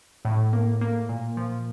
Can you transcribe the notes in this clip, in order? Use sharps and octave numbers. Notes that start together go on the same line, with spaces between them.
A2
A#3
A#3
A#2
F3